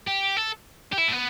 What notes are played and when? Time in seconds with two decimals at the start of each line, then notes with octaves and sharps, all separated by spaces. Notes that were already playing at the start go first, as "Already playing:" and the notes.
0.07 G4
0.37 A4
0.93 G4
0.98 E4
1.08 A3
1.12 B3